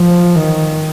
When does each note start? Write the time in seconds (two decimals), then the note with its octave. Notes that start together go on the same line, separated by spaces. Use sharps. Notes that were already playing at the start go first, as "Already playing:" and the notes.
Already playing: F3
0.36 D#3